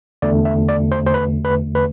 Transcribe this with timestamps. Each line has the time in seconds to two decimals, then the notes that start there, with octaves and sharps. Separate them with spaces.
0.22 E2 D3 A3 D5
0.45 E5
0.68 D5
0.92 C5
1.07 C5
1.14 B4
1.45 B4
1.75 B4